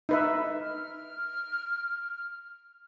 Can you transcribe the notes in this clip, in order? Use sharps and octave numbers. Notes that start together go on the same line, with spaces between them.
D#4 B4 E5
F6